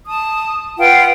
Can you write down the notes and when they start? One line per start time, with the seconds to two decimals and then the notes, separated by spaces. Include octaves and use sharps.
0.08 A5 D#6
0.79 F4 B4 F#5 G5